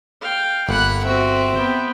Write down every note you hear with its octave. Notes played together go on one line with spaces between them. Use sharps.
F5 G5
G1 A#3 F#5 B5 F#6
C4 F#4 E5
B3 G5